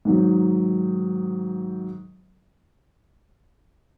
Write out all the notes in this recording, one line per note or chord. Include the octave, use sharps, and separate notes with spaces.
G#2 D#3 F#3